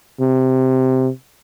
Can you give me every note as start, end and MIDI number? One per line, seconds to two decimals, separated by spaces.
0.20 1.09 48